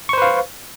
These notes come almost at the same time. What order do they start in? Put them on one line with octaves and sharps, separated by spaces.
C#6 C5 B4 F5